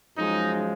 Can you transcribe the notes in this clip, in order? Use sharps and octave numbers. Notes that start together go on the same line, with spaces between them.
F#2 F3 G#3 D#4